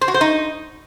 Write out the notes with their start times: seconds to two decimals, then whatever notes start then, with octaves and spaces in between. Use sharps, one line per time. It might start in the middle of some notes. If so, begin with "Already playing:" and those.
0.01 C5
0.08 F#4
0.14 C5
0.21 D#4